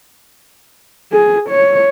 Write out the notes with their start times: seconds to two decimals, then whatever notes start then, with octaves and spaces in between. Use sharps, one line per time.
1.12 G#4
1.50 C#5